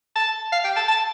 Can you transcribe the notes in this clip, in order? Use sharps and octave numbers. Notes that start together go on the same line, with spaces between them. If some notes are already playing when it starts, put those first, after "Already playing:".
A5
F5
G5
A5
A5